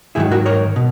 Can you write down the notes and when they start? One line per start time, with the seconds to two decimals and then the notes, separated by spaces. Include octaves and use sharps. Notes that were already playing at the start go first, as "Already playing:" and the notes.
0.15 G#2 D#3 F#3 E4 G#4
0.31 F#4 A#4
0.46 A#4 C#5
0.76 B2